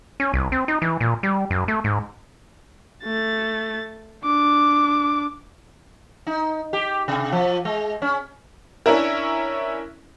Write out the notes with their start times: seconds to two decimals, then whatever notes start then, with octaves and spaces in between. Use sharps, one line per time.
0.20 C#4
0.34 C2
0.52 C4
0.68 D#4
0.82 E3
1.00 A#2
1.23 G3
1.51 F#2
1.68 A3
1.84 G#2
3.04 A3 A6
4.24 D4 D6
6.27 D#4
6.73 G4
7.08 C3
7.32 F3
7.65 G#3
8.02 C#4
8.86 C#4 D4 E4 A#4